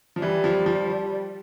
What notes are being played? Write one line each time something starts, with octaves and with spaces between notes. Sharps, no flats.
F3
E3 G3
F3
F3